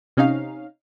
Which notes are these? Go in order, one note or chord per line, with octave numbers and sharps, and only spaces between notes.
C3 C#4 D#4 F5